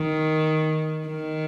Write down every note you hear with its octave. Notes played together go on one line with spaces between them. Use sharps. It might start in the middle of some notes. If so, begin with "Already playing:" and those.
Already playing: D#3
D#3